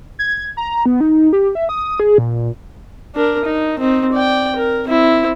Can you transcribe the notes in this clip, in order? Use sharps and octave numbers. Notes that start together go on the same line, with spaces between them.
G#6
A#5
B3
D#4
G4
E5
D#6
G#4
A#2
D4 A#4
D#4
C4 D#4
D5 G5
A#4
C4 E4